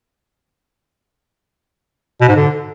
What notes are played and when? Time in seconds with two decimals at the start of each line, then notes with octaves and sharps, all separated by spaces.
2.21 B2
2.29 G#2
2.36 D3